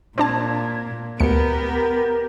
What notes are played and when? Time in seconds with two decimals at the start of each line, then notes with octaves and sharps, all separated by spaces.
0.18 A#2 C4 D4 A5 G#6
1.20 D2 B3 G4 A#4 C#7